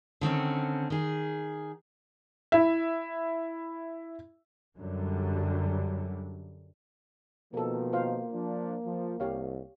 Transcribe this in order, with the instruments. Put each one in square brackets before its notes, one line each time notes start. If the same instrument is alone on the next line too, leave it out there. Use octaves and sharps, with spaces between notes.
[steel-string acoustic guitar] D3 D#3 C4 C#4
D#3 G#4
[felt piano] E4 E5
[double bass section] F#2 D3 F#3 G3
[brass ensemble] B2 D#3 F3 [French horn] A#3 [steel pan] A4 A#4
[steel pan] F4 C5 F5
[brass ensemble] F3 D4
F3
[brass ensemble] C2 [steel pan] G4 C#5 F5